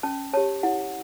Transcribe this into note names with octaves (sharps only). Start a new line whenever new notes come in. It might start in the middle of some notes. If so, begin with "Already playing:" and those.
C#4 A5
G4 C#5 A5
E4 F#5